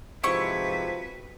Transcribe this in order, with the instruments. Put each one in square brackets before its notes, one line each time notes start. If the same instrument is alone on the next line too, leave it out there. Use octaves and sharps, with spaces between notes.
[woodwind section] G#2 C3 F3 [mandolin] E4 C#6 [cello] F#4 B4